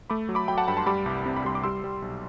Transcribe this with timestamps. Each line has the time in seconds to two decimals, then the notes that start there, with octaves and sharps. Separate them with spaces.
0.10 A3 B5 D6
0.29 F#3
0.35 B5 D6
0.48 F#3 G5 B5
0.58 F#5 A5
0.68 G2 G5 B5
0.77 A5 C6
0.86 G3 B5 D6
1.06 C2
1.26 C3
1.36 B5
1.45 G3 C6
1.55 D6
1.64 G3 C6 E6
1.84 G3
2.02 B1